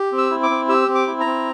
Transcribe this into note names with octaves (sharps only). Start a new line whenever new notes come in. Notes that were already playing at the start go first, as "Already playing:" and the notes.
Already playing: G4
C4
E6
E4
D6
C4
G4 E6
C4
D6
E4
A#5
C4